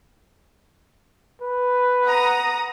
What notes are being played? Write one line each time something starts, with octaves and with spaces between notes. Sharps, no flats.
B4
F#5 A#5 D#6